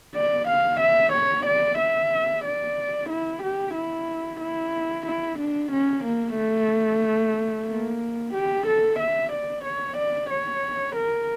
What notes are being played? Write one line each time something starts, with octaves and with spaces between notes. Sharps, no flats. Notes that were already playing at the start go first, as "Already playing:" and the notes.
D5
F5
E5
C#5
D5
E5
D5
E4
G4
E4
E4
E4
D4
C#4
A#3
A3
A#3
G4
A4
E5
D5
C#5
D5
C#5
A#4